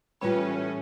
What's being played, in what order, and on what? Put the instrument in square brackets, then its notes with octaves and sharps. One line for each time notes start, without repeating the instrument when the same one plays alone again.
[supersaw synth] A2 C#4 [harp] E3 G3 [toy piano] F4 B5 [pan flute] B4